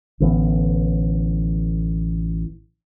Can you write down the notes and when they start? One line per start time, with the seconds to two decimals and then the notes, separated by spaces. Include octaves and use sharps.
0.20 A1 D3 E3 B3